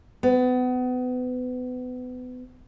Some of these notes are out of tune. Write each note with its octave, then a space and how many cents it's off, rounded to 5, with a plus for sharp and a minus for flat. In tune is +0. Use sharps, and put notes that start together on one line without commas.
B3 +30